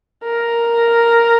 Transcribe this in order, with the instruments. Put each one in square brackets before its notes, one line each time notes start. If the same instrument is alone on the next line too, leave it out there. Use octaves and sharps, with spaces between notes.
[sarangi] A#4